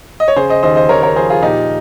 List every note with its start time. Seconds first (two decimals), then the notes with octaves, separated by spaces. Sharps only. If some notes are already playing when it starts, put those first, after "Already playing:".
0.20 D#5
0.28 C#5
0.36 C#3 G#4 C5
0.50 C5 D#5
0.63 D#2 C5 D#5
0.76 C5 D#5
0.89 D#2 A#4 C#5
1.03 A#4 C#5
1.16 F3 G#4 C5
1.30 F4 G#4
1.42 A#2 D#4 G4